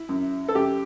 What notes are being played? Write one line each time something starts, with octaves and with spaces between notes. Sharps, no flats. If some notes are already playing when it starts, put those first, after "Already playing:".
Already playing: E4
F#2
A4
F#2 G4